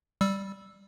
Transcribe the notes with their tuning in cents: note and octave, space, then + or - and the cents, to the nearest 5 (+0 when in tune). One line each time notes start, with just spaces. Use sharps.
G3 +0 E6 +0